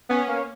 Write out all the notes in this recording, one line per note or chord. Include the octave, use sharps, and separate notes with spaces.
B3 C#4
A#3